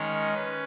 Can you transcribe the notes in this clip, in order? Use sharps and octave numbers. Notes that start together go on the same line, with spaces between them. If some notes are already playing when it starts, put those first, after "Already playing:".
Already playing: D#3 G#3 C#4 C#5
C#4 B4